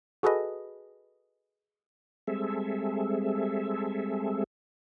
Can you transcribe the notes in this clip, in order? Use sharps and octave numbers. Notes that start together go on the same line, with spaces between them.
F#4 G#4 A4 B4 D#5
G3 G#3 C4 G#4 A4 E5